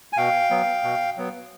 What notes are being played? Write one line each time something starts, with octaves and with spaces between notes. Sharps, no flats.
G#5
B2 F5 G5
F#3 B3
B2
F#3 B3